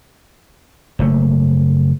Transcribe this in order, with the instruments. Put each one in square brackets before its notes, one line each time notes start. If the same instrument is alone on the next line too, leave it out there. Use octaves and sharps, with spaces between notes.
[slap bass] F#1 A3